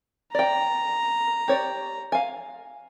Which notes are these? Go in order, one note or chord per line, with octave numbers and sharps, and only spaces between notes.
D5 G5 A#5
G4 C#5 D5
F5 G#5